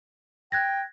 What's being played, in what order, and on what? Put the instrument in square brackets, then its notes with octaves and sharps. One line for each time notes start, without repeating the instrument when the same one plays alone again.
[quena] G5 [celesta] F#6 G#6 A#6